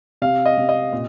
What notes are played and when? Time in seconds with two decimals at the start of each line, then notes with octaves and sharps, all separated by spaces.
0.22 C3 F5
0.46 D#5
0.57 C3
0.69 D#5
0.93 A#2